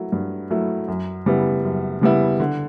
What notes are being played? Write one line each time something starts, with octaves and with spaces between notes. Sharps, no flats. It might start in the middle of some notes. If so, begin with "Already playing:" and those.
Already playing: F#3 A3 E4
G2
F#3 A3 E4
F#2
C#3 G3 B3 E4
F#2
C#3 G3 B3 E4
D3